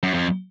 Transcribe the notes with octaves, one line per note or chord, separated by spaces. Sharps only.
F#2
F2